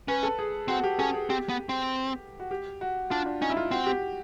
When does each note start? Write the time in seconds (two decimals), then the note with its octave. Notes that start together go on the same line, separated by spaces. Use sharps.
0.08 C#4 B4
0.23 A4
0.39 G#4
0.68 C4 F#4
0.84 G4
0.99 C#4 A4
1.14 G#4
1.30 C4 G4
1.49 B3
1.69 C4
2.40 F#4
2.51 G4
2.81 F#4
3.10 D4 F4
3.26 D4
3.41 C#4 D#4
3.50 E4
3.57 F4
3.71 C4 F#4
3.86 G4